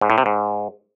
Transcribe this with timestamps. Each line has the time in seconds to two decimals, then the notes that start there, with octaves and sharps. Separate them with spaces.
0.01 G#2
0.10 A2
0.18 C3
0.26 G#2